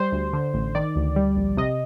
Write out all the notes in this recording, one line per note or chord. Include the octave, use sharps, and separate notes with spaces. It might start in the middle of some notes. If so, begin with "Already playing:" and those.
Already playing: G3 C5
D2
D3
A1
D#3 D5
D2
G3
A#1
C3 D#5